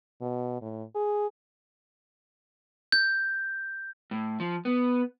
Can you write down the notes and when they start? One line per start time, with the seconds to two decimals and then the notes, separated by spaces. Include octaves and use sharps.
0.21 B2
0.61 A2
0.95 G#4
2.92 G6
4.11 A2
4.40 F3
4.65 B3